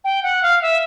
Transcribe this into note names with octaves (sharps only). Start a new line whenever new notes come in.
G5
F#5
F5
E5